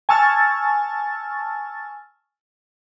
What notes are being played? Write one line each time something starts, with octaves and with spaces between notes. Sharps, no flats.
G#5 A5 C#6 E6 F6 A6